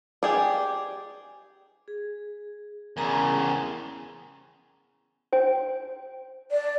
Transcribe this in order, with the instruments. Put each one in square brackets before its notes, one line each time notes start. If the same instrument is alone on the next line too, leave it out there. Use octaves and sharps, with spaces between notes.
[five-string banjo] G4 G#4 D5
[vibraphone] G#4
[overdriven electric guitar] E2 C#3 [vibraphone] A#4 G#5 A#5
[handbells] C5 G5
[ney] D5